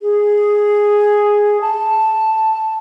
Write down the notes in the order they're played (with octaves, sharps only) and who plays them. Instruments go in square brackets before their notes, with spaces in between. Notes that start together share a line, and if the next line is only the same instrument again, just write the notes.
[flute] G#4
A5